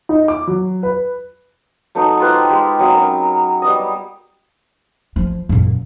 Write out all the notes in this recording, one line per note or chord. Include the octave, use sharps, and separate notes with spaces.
D#4
D6
F#3
B4
F#3 A3 B3 D#4
F4 G4 B4 C5
G#3 G4
F#3 C4 G#4
C#4 A#4
G3 B3 E4 D#5
F3
F#2 A#2